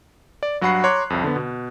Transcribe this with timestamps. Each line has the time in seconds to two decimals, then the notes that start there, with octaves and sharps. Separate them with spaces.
0.43 D5
0.61 G2 F#3 F#4 F#5 B5 C7
0.84 C#5 A#5 C6 D6 F#6
1.10 C2 F2
1.24 D3 B3
1.36 B2